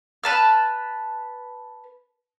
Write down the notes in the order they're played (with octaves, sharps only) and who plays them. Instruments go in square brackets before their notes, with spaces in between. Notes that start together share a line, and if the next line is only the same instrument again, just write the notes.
[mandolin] B4 A5 F6